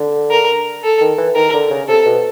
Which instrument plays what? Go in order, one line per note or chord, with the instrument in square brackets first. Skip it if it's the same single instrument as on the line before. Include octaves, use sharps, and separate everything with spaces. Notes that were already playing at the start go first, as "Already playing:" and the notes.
Already playing: [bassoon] D3
[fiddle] A#4
A4
[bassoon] D#3
E3
[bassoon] D#3 [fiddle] A#4
[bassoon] D3
C#3
[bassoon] C3 [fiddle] A4
[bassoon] B2